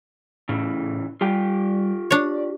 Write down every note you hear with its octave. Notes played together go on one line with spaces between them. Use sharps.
A2 C#3 E3
G3 F4 G4 G5
D4 C#5 D5